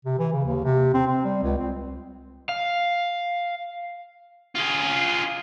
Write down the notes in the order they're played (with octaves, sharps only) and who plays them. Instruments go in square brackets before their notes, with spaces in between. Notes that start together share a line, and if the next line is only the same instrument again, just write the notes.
[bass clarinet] C3
E3
C#3
D#2
C3
C4
C4
G3
C#2
C4
[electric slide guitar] F5
[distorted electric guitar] F4 G#4